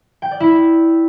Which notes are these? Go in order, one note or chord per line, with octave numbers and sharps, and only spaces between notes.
G5
D5
E4